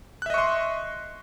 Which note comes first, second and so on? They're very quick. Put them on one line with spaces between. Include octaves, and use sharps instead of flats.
F#6 E5 D#5 C#6 C6